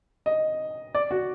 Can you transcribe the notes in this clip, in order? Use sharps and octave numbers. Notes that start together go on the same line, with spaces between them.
D#5
D5
F#4